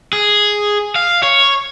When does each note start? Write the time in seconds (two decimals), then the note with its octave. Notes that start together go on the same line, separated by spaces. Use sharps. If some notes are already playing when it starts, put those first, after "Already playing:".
0.13 G#4
0.96 F5
1.23 C#5